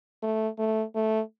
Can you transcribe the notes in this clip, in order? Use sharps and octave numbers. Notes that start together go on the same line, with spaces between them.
A3
A3
A3